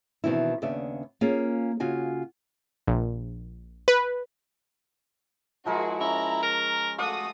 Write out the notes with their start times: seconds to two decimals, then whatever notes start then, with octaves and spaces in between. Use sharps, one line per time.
0.24 B2 D#3 E3 C4 D4 E4
0.62 D#2 C#3 B3 D4 D5 E5
1.21 A#3 C#4 F4 G#4
1.80 C#3 F4 F#4 G#5
2.87 A#1
3.88 B4
5.66 F3 G#3 E4 F#4 G#4 A#4
6.00 C#4 E4 A#5
6.43 A#4
6.98 A3 F#4 F5 D6 D#6